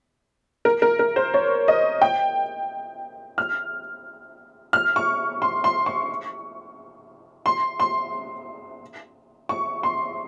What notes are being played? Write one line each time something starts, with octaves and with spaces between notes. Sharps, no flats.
A#4
A#4
A#4
C5
C#5
D#5
G5
F6
F6
C#6
C6
C6
C#6
C6
C6
C#6
C6